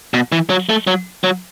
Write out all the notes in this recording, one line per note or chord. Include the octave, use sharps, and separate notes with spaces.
B2
E3
F#3
A3
F#3
F#3